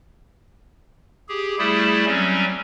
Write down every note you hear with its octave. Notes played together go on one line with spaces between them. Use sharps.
G4 G#4
G3 A3 E4 G#4
F#3 G3 C4 C#4